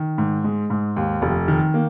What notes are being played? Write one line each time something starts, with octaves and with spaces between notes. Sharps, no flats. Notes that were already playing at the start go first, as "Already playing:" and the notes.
Already playing: D#3
G#2
G#3
G#2
D#2
F1
D#3
A#3